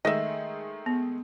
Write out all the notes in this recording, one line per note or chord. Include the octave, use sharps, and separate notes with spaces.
D#3 G#3 A3 D#5 E5
B3